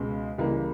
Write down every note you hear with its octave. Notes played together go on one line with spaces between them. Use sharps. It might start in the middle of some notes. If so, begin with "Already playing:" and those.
Already playing: C#2 B2 G#3
C#2 C#3 E3 G3 A#3